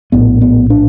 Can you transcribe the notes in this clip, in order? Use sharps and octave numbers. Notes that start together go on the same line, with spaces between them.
A#1 A2 B3
B3
D4